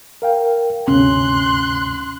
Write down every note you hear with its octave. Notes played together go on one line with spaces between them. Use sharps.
A#4 F5 G5
D2 G2 C3 C#4 C6 F#6